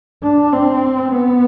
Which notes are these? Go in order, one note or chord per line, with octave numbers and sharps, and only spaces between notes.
D4
C4
B3